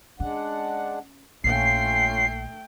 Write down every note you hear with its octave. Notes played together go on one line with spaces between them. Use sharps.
G#3 C#4 D4 F#5
A#1 A3 C#4 F4 G5 C7